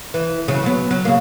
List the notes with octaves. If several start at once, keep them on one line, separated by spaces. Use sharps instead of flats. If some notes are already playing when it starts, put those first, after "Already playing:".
E3
C#3 F#3
F#3 B3
F#3
C#3 A#3